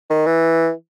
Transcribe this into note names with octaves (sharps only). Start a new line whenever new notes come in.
D#3
E3